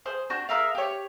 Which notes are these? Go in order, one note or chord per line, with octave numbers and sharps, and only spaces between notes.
G#4 C5
D4 F#4 G6
G#4 A#4 E5 F5
G4 C#5